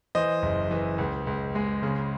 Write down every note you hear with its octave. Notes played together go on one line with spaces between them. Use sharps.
E3 C5 D#5
F#1
E3
C#2
C#2
G#3
C#3